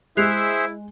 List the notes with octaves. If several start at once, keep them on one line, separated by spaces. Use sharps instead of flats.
G#3 E4 G#4 C5 E5 F#6 C7 F7